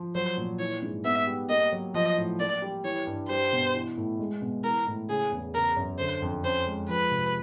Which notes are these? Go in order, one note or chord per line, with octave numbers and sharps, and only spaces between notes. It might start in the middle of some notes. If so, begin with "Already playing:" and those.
Already playing: F3
F#3 C5
A#2
E3 C#5
G#2
B3 E5
G3
A#3 D#5
F#3
F3 D#5
A2
A#3 D5
G3
E3 C#5
G2
G3 C5
B2
E3
A2
G#3
B2
E3 A#4
A2
C#3 G#4
E2
C#3 A#4
F#2
D3 C5
F2
C#4 C5
G#3
F3 B4
C3